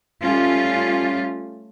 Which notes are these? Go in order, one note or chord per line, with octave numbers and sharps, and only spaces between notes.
G3 A3 C#4 F4